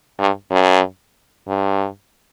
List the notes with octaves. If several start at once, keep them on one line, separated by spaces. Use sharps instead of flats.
G2
F#2
G2